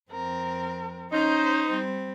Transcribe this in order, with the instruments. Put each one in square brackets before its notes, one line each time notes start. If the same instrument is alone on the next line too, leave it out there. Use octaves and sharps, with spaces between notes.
[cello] F2 C4 [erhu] A#4
[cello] C#4 [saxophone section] D#4 [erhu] C5
[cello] G3 C4